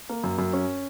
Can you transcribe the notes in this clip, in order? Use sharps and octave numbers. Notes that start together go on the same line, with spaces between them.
A#3
F#2
F#2
C#4